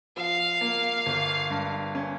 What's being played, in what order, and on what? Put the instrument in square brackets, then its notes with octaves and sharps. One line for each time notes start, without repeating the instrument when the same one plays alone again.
[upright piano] F3 [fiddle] F5
[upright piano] A#3
G1
G2
C#4